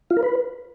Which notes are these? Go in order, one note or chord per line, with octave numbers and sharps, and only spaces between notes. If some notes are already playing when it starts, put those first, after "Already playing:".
F4
A#4
B4